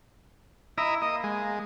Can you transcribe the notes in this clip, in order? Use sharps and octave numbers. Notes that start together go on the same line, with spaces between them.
E4 D#5 E5 A#5
A#3 D#5
G#3